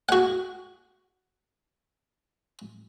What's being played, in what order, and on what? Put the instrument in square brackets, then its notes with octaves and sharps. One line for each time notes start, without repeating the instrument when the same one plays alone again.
[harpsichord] F#4 F#5